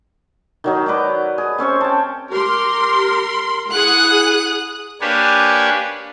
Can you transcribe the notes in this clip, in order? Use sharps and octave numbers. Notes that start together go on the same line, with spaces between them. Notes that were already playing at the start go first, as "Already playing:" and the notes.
D#3 F#3 D#4
B4 D5 D#5 A#5
G#4
C4 C#4 C5 C#6
G5 A5
G4 A#4 C6
E4 G#4 F#5 D#6 F#6
A#3 D4 G4 B4 C#5 G#5